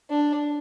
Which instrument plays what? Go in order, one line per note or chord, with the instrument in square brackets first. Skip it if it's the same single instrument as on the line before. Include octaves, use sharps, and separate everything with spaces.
[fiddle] D4